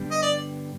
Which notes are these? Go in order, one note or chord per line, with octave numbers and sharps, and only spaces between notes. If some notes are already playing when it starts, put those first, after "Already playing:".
Already playing: G2 D3 G3 B3 D4
D#5
D5